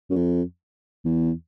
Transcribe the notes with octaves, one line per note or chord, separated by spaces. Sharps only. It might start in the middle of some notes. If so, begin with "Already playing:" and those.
F#2
F2
E2